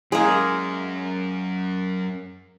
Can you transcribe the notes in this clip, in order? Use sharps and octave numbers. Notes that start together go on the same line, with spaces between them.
F#2 G#3 A#3